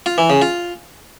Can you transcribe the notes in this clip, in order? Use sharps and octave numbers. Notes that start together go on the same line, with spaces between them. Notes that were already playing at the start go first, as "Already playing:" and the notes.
F4
E3
C#3
F4